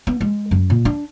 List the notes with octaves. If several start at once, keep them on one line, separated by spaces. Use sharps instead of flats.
B3
G#3
F#2
A#2
D4